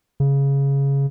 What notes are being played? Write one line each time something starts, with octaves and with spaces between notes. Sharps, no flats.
C#3